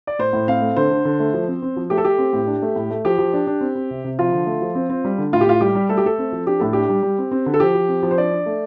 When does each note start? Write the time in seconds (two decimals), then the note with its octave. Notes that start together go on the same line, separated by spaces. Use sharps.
0.07 D5
0.19 A2 C5
0.33 A2
0.47 C4 F5
0.62 A3
0.76 D3 C5
0.91 D3
1.05 D3
1.20 A3
1.34 F3
1.48 C4
1.62 C4
1.76 F3
1.90 A3 G4
1.98 A4
2.05 A3 G4
2.18 C4
2.33 A2
2.47 D4
2.62 A3
2.76 A2
2.90 A3
3.05 F3 G4
3.18 F3
3.34 D4
3.47 D4
3.61 C4
3.75 C4
3.91 C3
4.04 C3
4.19 F3 F4
4.32 D3
4.46 A3
4.61 F3
4.75 C4
4.90 C4
5.05 G3
5.18 D3
5.33 A2 F4
5.41 G4
5.47 A2 F4
5.61 G3 G4
5.75 G3
5.89 A3 A4
5.97 G4
6.04 A3 A4
6.19 C4
6.32 F3
6.46 D4 G4
6.60 A2 A4
6.73 D4 G4
6.89 G3
7.03 G3
7.18 C4
7.31 C4
7.46 D3
7.54 A4
7.60 F3 G4
7.75 F3
7.88 C4
8.03 F3
8.11 C5
8.18 D4 D5
8.31 D4
8.46 A3